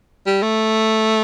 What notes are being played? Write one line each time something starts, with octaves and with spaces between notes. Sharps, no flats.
G3
A3